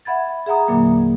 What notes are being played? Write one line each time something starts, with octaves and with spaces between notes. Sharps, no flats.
E5 F#5 B5 G#6 A6
G#4 E5 F#5 A#5 D#6
E2 A#2 D3 F#3 A#3